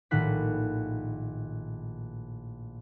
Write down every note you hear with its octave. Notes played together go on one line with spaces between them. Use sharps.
A#1 A2 D#3 F#5 F#6 B6